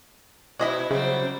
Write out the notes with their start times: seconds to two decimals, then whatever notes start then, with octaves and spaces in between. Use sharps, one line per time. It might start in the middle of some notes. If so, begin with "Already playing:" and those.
0.59 B2 E4 D5 D#5 B5
0.90 C#3 F#3 G3 C4